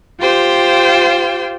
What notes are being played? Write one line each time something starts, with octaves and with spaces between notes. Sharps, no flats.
F4 G4 C5 G5